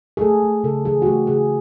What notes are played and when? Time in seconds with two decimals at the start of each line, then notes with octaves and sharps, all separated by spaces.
0.17 G#4
0.21 A3 A4
0.43 A3
0.64 C#3 A4
0.85 E3 G#4
1.02 F#4
1.06 A3 G4
1.27 C#3 G#4